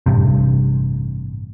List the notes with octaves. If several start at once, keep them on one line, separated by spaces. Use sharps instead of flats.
A1 G2 C3